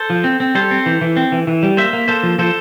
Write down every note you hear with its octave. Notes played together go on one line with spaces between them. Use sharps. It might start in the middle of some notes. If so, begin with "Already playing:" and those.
Already playing: A4 C5
F3
C4
C4
G3 A4 C5
C4
E3
E3
C4
E3
E3
G3
A#3 C5 E5
A#3
A#3 A4 C5
F3
F3 A4 C5